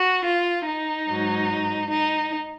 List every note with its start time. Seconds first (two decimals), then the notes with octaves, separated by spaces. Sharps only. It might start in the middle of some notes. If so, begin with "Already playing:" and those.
Already playing: F#4
0.24 F4
0.65 D#4
1.07 G#2 F#3
1.90 D#4